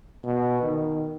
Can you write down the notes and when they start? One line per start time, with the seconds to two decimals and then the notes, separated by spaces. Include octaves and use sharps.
0.24 B2
0.62 D#3